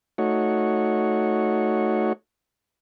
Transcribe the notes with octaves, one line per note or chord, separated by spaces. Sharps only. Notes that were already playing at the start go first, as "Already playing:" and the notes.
A3 D#4 F#4 C#5